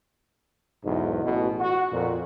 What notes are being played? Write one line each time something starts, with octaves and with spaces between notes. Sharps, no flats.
B1 E2 G#2
A1 B2
F#4
F2 A#2